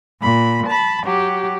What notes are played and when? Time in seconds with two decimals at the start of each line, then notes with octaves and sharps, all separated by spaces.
0.20 A#2 B5
0.66 A5 B5
1.04 F#3 G4